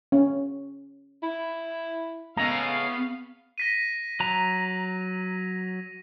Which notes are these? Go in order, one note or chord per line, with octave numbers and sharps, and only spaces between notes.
C#4
E4
A2 C#3 G#3 B3 F5 A#5
A#6 B6 D#7
F#3 A#5